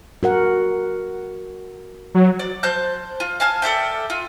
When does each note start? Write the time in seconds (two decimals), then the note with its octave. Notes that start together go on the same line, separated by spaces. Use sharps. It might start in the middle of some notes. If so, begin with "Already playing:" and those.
0.23 F#4 A#4 F#5
2.15 F#3
2.39 D5
2.63 C5 A5 F#6 G6
3.20 F4
3.40 F5 G#5 A5 F6
3.62 A4 D5 E5 G5
4.10 F4